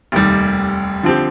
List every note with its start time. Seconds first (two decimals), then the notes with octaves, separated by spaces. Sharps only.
0.12 F1 D#2 D#3 G3
1.03 D3 F3 C4 G4